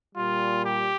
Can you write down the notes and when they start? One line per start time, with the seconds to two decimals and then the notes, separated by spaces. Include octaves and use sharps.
0.14 A#2 G3 F4
0.65 G4